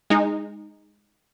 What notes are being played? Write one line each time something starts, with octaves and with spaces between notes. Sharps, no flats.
G#3 D#4